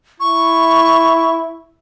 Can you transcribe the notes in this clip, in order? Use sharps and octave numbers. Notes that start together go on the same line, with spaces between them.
E4 C#6